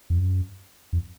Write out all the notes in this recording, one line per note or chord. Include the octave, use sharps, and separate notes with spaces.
F2
F#2
F2